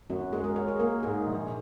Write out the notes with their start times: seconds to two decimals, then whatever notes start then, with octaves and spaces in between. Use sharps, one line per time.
0.10 F#2 F#4
0.32 G#3 G#4
0.44 A#4
0.56 A#4 C#5
0.68 G#4
0.79 A#3 A#4
1.03 G#2 G#4
1.27 A#1